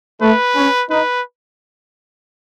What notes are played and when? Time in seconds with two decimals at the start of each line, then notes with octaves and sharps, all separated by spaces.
0.21 A3 B4
0.56 C#4
0.89 D#4 B4